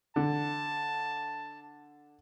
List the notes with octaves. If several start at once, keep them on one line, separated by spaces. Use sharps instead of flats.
D3 A5